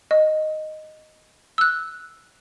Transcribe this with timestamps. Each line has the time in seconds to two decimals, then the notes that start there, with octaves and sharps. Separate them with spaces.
0.11 D#5
1.58 E6 F#6